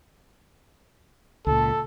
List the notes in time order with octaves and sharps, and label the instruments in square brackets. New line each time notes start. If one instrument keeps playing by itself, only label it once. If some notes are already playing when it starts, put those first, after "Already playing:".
[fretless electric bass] C#2 A#2 [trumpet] A4